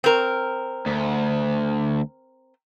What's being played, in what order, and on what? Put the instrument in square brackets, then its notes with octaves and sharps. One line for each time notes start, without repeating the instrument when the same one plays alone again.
[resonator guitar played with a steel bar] C4 A#4
[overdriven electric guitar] D2